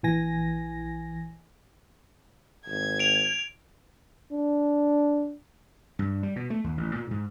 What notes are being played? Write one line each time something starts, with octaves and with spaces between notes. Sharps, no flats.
A#1 E3 G#5 A#6
G#1 G#6
D7 F7
D4
G2
G3
B2
A3
D#2
A1
A#2
G#2